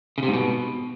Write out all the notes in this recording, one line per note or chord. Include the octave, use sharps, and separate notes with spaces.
C#3
C3
G#2
B2